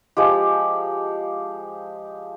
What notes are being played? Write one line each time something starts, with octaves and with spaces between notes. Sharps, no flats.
F3 G#3 G4